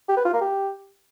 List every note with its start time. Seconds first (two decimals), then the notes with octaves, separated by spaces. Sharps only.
0.09 G4
0.17 B4
0.25 F4
0.33 A#3
0.41 G4